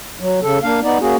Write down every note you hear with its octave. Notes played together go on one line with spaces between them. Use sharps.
F#3
C#3 A4
A#3 D4 F5
B3 D#4 D5
A#3 C#4 F#4 G#4